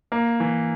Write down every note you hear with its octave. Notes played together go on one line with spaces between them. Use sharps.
A#3
E3